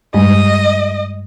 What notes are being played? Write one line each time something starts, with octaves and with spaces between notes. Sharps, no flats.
G2 G3 G#3 D#5